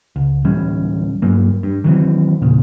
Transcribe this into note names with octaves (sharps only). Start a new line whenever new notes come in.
C#2
D1 E3 G3 C#4
G2 F#3 A#3
G2
D#3 E3 F#3 C4
E2 A#2 C#3